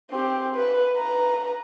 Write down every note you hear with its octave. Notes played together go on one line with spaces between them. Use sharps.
C4 G4
B4
B4 A#5